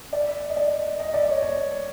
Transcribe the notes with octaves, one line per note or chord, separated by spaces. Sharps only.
D5
D#5
D5
D#5
D5
C#5
C#5